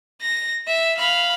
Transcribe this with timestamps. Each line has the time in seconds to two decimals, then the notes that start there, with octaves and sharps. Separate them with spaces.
0.22 A#6
0.67 E5
0.98 F5 B5